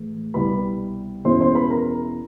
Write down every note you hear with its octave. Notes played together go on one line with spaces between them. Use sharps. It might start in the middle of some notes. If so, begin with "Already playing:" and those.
Already playing: A2 E3 G#3
C2 B2 G3 B4 B5
E2 B2 G#3 C#4 E4 C5 C6
C5 C6
B4 B5
A#4 A#5